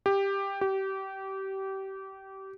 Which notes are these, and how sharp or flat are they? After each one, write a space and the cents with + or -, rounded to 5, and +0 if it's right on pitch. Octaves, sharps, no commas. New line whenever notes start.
G4 +10
G4 -25